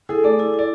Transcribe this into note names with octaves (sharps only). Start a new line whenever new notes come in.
E4 G#4 A4
A3 D5
E4 A4
E4 D5